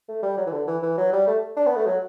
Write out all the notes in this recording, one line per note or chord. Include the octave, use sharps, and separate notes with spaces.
A3
G3
F#3
E3
D3
E3
E3
F#3
G3
A3
D4
B3
A3
F#3